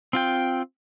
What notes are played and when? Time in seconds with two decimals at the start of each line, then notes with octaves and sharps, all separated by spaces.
0.13 C4 F4 G5